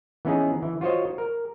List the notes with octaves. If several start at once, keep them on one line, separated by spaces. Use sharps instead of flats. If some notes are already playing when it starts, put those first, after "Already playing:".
E3 B3 C#4 D#4 G#4
E3
F4 F#4 C5 C#5 D#5
A#4